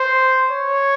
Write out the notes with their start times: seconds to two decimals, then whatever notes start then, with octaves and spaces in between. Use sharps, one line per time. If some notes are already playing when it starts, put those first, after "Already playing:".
Already playing: C5
0.50 C#5